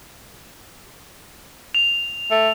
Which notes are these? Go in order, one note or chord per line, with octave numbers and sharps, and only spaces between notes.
F7
A3